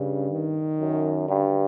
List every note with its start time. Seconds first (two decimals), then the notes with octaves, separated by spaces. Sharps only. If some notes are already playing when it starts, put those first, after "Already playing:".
Already playing: G2 C#3
0.32 D#3
0.80 F#2
1.27 G2 D3